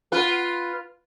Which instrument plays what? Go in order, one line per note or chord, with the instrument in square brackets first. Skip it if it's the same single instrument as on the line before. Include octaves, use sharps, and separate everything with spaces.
[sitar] F4 B4